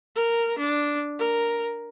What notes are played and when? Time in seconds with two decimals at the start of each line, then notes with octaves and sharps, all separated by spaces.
0.16 A#4
0.58 D4
1.19 A#4